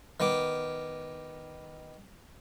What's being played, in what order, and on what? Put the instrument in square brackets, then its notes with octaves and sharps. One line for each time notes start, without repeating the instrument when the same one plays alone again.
[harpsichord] D#3 B3 D6